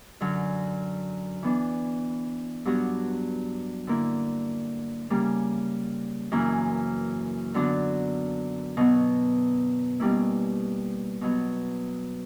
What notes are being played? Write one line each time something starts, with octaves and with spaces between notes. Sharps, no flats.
F#2 D3 F#3
E3 B3 D4
G2 F#3 B3 D4 F#4
D3 A#3 E4
C#3 G3 A#3
F#2 C#3 E3 A#3 E4
D3 F#3 B3 D4 F#4
B2 F#3 B3
B2 G3 A#3 C#4 E4
B2 F#3 B3